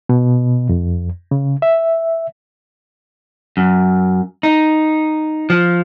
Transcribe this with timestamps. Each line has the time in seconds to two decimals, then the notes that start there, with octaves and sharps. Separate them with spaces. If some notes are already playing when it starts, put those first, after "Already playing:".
0.09 B2
0.69 F2
1.31 C#3
1.62 E5
3.57 F#2
4.43 D#4
5.50 F3